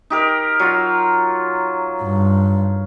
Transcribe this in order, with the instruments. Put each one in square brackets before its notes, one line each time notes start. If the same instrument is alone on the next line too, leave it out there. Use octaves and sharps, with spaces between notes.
[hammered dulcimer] D#4 G4 A#4
F#3 F4
[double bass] G2